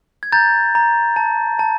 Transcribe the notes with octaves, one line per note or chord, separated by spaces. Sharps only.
G#6
A#5 G6 A6
A#5
A5
A5